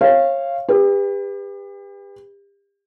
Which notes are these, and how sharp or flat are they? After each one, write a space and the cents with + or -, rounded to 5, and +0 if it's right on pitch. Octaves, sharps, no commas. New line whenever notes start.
C#5 -30 F5 -15
G4 +35 B4 +0